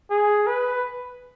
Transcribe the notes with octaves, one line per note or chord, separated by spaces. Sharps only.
G#4
B4